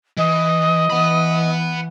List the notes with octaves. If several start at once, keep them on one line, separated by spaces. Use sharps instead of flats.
E3 D#5
E3 F#5 B5